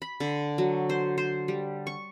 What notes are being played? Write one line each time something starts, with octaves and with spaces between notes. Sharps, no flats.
B5
D3
F#3
C5
C5
G3
C#6